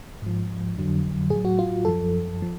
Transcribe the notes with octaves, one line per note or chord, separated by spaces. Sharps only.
G#2 F3
F2 D3 F#3
A2 G#4
F#3
F#4
F4
F#2 F3 A4
F3